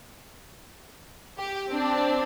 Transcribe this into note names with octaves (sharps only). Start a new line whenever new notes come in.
G4
C4 D4